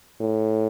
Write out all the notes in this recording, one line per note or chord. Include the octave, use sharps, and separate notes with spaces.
A2